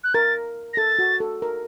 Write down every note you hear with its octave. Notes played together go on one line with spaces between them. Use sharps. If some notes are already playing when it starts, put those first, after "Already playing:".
F#6
A#4 A6
A#6
A4 A6
F#4
A4
A#4